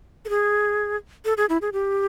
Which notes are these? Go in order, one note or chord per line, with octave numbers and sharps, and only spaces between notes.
A4
G#4
A4
G#4
E4
G#4
G4